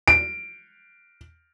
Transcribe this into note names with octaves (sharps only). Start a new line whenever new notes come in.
D7